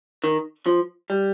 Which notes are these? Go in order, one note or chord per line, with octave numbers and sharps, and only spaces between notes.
D#3
F3
G3